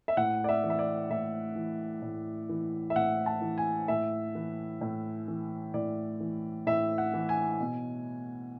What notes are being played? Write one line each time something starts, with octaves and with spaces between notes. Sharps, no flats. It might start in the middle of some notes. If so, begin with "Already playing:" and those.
E5
A2 F#5
D5
E5
E3
E5
D5
A2 E5
E3
A2
E3
E5
A2 F#5
A5
E3
G#5
A2 E5
E3
A2
E3
A2 D5
E3
A2 E5
F#5
E3
G#5
B2